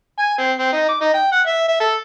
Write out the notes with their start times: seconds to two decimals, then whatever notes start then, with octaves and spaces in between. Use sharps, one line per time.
0.19 G#5
0.38 C4
0.58 C4
0.73 D#4
0.89 D6
1.01 D#4
1.14 G5
1.32 F#5
1.47 E5
1.68 E5
1.80 A4